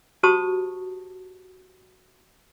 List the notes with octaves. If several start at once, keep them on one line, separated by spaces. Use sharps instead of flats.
F#4 G4 C5 A5 C#6 D#6